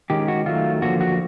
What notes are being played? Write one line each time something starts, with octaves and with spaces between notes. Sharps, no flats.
D#3 G#3 C#4 G4
F#4
D#3 F#3 A3 F4
D3 F3 A#3 F#4
F#4